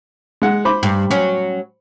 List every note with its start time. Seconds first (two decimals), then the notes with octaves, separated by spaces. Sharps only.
0.42 G#3 F#5
0.65 C5 B5 D6
0.83 G2
1.11 F#3 C#4